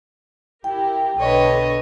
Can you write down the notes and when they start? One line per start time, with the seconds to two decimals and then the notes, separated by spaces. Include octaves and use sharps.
0.64 E4 G4 A#4 G5
1.20 B1 D3 A4 B4 C#5 D#5